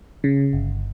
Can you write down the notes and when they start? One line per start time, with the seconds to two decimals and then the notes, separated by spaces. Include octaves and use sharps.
0.24 C#3
0.53 G1